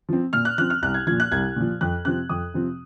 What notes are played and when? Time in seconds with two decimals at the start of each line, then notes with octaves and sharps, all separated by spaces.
0.09 F3 C4
0.33 A#2 F6
0.45 F#6
0.58 F3 C4 F#6
0.70 F6
0.82 C2 F#6
0.94 G#6
1.07 A#2 F3 G#6
1.20 F#6
1.31 C2 G#6
1.56 A#2 F3
1.81 F2 F#6
2.05 C3 F3 C4 F#6
2.29 F2 D#6
2.54 C3 F3 C4